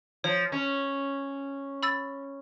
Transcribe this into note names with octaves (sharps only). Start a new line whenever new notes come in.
F3 C#5
C#4
B5 E6 A6